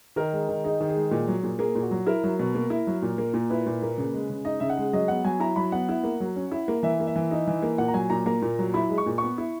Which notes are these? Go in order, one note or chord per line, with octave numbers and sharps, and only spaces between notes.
D#3 A#4
G#3
D#3
D#4 G#4
D#3
G#4
G#3
A#2
F#3
A#2
A#3 G#4
A#2
F#4
F#3
E4 A#4
F#3
B2
A#3
E4
F#3
A#2
A#3
A#2
E4 B4
A#2
A#3
C#3
G#3
C#3
D#4 D#5
C#3 E5
F#5
G#3
F#3 D#5
B3 F#5
F#3 G#5
E4 A#5
F#3 B5
B3 F#5
E4
A#3
F#3
C#4
E4
A#3
E3 E5
A#3
E5
E3
D#4
E3
A#3
A#2 F#5
A#5
F#3 G#5
A#2 A#5
A#3 A#5
A#2
F#3
E4 B5
G#3
C#6
A#2
B3 C#6
E4